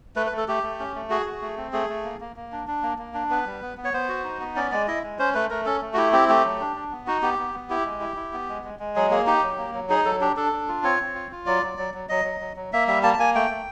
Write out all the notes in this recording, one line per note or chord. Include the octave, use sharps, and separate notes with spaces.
A3 B4
B4
A3
A4
A3 G4
A3
C#4
A3
F#4 G#4
F#4
A3
C4
A3 G#4
A3
A#3
A#3
A#3
D4
D4
A#3
A#3
D4
B3 B4
G3
B3
B3
C#5
B3 C5
F#4
D#4
B3
C#4 D5
G#3 D5
E4 D#5
G#3
C#4 C5
A3 B4
A3 A#4
C#4 A4
A3
F#4
E4 G4
C4 G4
A3 G4
F#3
D4
D4
B3
D#4 F#4
B3 G4
B3
B3
E4 G4
G#3
E4
E4
B3
G#3
G#3
G#3
F#3 G#4
A#3 G#4
D#4 G4
F#3
A#3
F#3
D#4 G#4
F#3 A4
D4 G4
D4 A4
D4
F4
C4 C#5
C4
F4
F4
F#3 D5
F#3
F#3
F#3
F#3 D#5
F#3
F#3
F#3
A#3 E5
G3 E5
A#3 A5
A5
A#3 G#5
A3 G5
A3